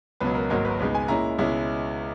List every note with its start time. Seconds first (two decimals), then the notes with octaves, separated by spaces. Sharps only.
0.20 C#2 B2 F#3 B4
0.35 A#4
0.50 G#1 G#2 F#3 A#3 A#4
0.65 B4
0.79 C#2 B2 G#3 D#4 B4
0.95 G#5
1.08 A#2 G#3 C#4 E4 A#5
1.38 C#2 B2 G#3 C#4 E4